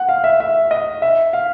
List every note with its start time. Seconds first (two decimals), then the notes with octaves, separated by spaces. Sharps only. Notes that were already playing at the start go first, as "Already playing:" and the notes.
Already playing: F#5
0.09 F5
0.24 E5
0.40 E5
0.71 D#5
1.02 E5
1.33 F5